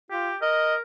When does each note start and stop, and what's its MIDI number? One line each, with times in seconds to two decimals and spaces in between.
0.11 0.30 65
0.11 0.37 67
0.42 0.80 70
0.42 0.75 75